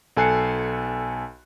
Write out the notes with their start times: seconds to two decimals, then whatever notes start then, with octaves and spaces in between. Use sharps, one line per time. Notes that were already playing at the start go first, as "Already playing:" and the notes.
0.17 B1 A4 G#5 F#6 C7 C#7